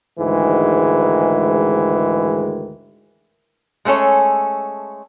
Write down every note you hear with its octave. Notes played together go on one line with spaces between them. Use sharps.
D2 G#2 D#3 E3 G#3
G#3 A3 C#4 A4 C#5